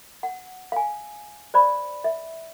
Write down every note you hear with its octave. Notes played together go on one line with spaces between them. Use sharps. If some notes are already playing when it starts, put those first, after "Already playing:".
F#5
F5 G#5
C5 D5 B5
E5